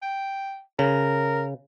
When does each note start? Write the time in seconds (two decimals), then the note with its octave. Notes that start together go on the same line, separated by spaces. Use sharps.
0.02 G5
0.79 C#3 A#4